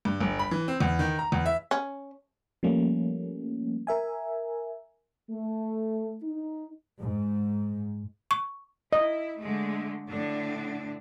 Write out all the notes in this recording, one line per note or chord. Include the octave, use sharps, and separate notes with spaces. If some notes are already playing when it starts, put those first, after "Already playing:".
G2
G1
B5
E3
C4
E2
D#3
A#5
E2
E5
C#4
F3 G3 A3 A#3 C#4
A#4 E5 G#5
A3
D#4
G#2
C#6
E4 D#5
D3 G#3 A3
A2 D3 D4